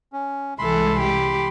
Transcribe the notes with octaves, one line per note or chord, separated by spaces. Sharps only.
C#4
C2 C3 E3 G#3 A4 B5 C6
G4